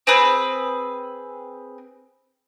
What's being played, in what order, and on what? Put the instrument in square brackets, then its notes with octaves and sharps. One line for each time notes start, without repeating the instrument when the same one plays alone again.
[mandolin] C4 G#4 B4